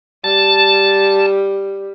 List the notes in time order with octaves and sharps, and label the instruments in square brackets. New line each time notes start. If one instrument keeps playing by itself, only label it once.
[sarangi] G3 [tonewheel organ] A5